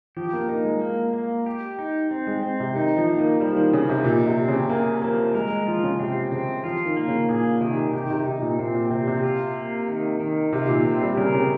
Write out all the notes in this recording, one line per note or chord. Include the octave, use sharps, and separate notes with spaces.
F3 G4
A#3
A#3 D#4
G#3
A#3
A#3
G4
D#4
C4
G#3
C4
C3
D#3 D#4
F3
A#3
D#3
F3 G3
D#3
C#3 F3
C3
A#2 D#4
C3
C4
C#3
A#3 G#4
F3 A#3
G#3 A#4
G#3
F3 F4
C#3
C3 C4
C#3 C4
F3 F4
D#3
A#3
C#3
A#2 G#4
C3 D#3
C3 G4
C3
C3 D#4
A#2
A#2 C4
A#2
C3 C4
C3
F4
A#3
D#3
D#3
C3 F4
A#2
C4
G3
C#3 A#4
C#3